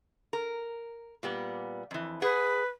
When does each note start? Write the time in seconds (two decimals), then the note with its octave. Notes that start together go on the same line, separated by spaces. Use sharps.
0.33 A#4
1.23 A#2 G3 B3
1.91 F2 E3
2.22 G#4 B4 F#5